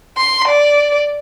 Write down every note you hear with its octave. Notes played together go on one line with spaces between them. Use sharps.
C6
D5